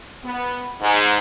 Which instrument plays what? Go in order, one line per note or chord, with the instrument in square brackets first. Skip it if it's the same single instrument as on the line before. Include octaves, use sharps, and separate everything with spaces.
[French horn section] B3
G#2